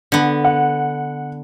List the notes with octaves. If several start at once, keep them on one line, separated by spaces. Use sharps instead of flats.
D3 B3
F#5